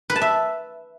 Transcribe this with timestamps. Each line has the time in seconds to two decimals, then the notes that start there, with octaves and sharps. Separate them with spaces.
0.10 B4
0.16 A5
0.21 E5